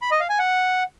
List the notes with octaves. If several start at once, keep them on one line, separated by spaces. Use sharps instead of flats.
B5
D#5
F5
G#5
F#5